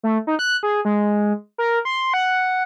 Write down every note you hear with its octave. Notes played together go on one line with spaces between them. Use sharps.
A3
D#4
F#6
G#4
G#3
A#4
C6
F#5